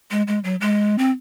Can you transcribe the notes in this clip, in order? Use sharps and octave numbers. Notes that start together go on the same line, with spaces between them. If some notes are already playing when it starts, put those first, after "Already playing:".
G#3
G#3
F#3
G#3
C4